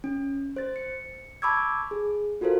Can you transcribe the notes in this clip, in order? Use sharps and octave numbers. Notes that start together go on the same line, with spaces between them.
C#4
C5 A6
C#7
A5 B5 C#6 D6 E6 G#6
G#4
F4 F#4 A4 A#4 C5 F5